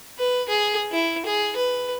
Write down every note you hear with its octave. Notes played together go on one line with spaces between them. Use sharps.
B4
G#4
E4
G#4
B4